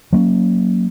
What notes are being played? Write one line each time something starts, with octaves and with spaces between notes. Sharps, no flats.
F#3 A#3 C#4